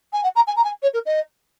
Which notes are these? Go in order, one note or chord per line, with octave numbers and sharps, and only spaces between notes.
G#5
F#5
A#5
G#5
A#5
G#5
C#5
A#4
D#5